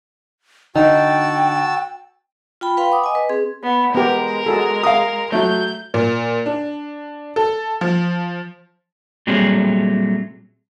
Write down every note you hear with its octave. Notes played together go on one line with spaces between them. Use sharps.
D3 D#4 F#4 G5 A5 E6
F4 G5 B5
B4 F5 G5 B5 C6
F#5 D6 D#6
D#5 G#5
B4
C4 G#4
B3
G#3 B3 G4 A#4
F#4 G#4 A4
F5 D#6
F#3 A3 G6
A#2
D4
A4
F3
A#2 F#3 G3 A3 C4 G#4